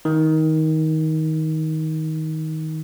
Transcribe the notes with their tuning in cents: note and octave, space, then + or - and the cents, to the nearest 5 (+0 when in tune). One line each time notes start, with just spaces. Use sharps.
D#3 +20